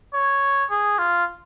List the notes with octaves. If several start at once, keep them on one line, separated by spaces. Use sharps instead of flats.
C#5
G#4
F4